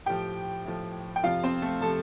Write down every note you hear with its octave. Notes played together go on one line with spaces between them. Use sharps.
A2 F3 G4 G5
A2 F3
G5
F2 C3 F3 F4 F5
C4 C5
A3 A4
C3 F3 A4 A5